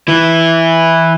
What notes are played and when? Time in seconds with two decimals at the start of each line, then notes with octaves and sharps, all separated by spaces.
0.08 E3 E4